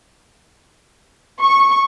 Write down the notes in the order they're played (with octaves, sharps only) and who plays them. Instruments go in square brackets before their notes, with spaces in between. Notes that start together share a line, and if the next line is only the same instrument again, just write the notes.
[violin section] C#6